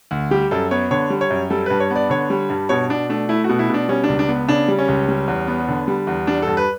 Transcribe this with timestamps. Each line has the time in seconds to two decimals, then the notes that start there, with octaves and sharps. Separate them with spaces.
0.11 D2
0.31 G3 G4
0.51 F#2 A4
0.71 B3 C#5
0.91 D3 C#5
1.10 G3
1.21 C#5
1.30 F#2
1.50 G3 A4
1.66 G2 B4
1.80 C#5
1.90 B3
1.96 D5
2.10 D3 C#5
2.30 G3
2.50 G2
2.69 B2 C#5
2.90 B2 D4
3.09 A3 D4
3.29 A3 E4
3.44 F#4
3.49 B2
3.59 E4
3.69 B2 D4
3.89 G3 C#4
4.04 C#2 D4
4.19 D4
4.28 B3
4.48 C#3 D4
4.68 G3
4.79 C#4
4.88 C#2
5.08 G3
5.28 E2
5.48 B3
5.68 D3
5.88 G3
6.07 E2
6.27 G3 D4
6.42 G2 A4
6.57 B4